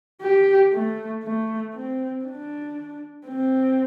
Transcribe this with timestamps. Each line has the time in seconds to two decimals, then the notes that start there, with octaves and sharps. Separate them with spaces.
0.22 G4
0.73 A3
1.24 A3
1.75 C4
2.26 D4
3.27 C4